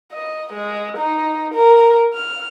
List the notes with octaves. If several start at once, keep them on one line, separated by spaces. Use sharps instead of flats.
D#5
G#3
D#4
A#4
F6